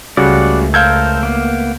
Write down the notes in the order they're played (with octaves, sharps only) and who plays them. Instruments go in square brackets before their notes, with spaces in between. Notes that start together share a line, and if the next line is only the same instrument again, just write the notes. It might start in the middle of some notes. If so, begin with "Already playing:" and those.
[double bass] C#2 A3 [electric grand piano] C#3 G3 F#4 [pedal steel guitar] D5 F#5
[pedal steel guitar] A4 A#4 C5 [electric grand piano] F5 G6 G#6
[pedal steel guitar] A#3 B3